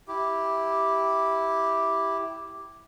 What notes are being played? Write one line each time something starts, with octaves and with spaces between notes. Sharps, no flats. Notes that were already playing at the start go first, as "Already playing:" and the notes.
E4 G4